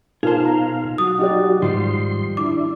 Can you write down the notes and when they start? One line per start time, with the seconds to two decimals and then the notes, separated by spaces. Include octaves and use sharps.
0.23 B2 D#4 F4 G#4 A#4 C5 F5 A5
0.45 A#5
0.98 F#3 F#4 D#6
1.19 D#4 G4 D5
1.62 G#2 D#3 F3 G3 C6
2.37 D4 E4 D6